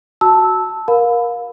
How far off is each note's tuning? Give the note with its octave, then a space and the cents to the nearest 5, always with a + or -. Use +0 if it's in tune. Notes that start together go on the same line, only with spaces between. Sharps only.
F#4 +0 A5 +0 E6 -10
A#4 +20 F5 +30 B5 +15